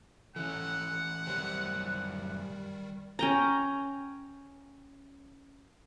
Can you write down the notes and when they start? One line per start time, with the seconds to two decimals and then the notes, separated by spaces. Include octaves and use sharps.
0.36 E3 C#4 A4 F#5
1.27 F#2 D#3 G3 G4 C5
3.19 C#4 G5 A#5